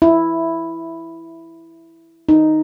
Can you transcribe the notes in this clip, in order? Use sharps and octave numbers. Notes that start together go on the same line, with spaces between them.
E4
D#4